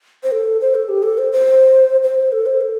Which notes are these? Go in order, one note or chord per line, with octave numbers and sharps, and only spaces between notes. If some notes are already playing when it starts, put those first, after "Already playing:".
C5
A4
C5
A4
G4
A4
C5
C5
C5
A4
C5
A4